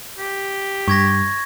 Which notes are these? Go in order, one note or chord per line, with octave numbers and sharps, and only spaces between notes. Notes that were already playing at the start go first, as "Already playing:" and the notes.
G4
G2 C#6 G#6 A#6